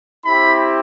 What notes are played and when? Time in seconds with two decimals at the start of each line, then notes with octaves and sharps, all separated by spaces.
0.25 C4 E4 G4 B5